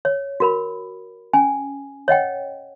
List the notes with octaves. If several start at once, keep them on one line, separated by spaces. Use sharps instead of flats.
C#5
F#4 A#4 B5
C#4 G#5
C#5 D#5 F#5 G5